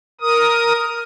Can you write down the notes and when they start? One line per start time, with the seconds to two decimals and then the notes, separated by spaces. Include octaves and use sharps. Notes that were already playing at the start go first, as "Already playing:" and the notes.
0.21 A#4 D#6